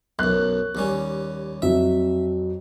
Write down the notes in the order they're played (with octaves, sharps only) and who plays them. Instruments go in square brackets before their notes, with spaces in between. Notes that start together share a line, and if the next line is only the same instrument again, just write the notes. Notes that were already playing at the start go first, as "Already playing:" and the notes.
[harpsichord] B1 F#2 [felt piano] F#6
[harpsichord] D#2 G3 C#4
[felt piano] F2 F#3 [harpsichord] E5